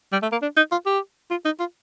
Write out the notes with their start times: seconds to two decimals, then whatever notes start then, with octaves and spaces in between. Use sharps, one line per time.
0.12 G3
0.22 A3
0.32 A#3
0.42 D4
0.57 D#4
0.71 F4
0.86 G4
1.30 F4
1.45 D#4
1.59 F4